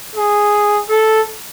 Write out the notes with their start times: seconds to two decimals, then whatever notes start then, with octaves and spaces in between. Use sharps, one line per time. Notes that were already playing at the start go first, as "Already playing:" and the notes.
0.15 G#4
0.89 A4